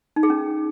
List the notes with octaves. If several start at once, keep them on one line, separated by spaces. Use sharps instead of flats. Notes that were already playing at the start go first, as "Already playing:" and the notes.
D#4
G#4
C#4